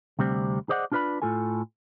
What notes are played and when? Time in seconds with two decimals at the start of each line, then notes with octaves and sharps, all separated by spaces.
0.19 D2 C3 G3 C4
0.69 G#4 C5 D5 D#5 F#5
0.92 D4 F4 G#4 B4 D5 B5
1.22 A2 F4 A4 G#5